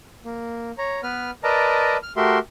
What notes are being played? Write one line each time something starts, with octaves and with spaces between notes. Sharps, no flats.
A#3
C#5 A#5
B3 B4 F6
A#4 B4 D5 D#5 A5 A#5
F6
A3 F#4 G4 A#4 E5 C6